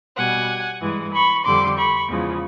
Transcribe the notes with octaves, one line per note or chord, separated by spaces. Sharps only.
B2 G3 F#5 G#5
G2 E3 G#3
B5 C#6
F2 D3 G3 C6 D6
B5 C#6
E2 C#3 F3 G#3